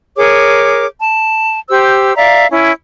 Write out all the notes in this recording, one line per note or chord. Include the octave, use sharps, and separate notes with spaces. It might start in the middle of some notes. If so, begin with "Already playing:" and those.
G#4 A#4 C#5 D6
A5
G4 C5 E6
D5 E5 F5 A#5
C#4 E4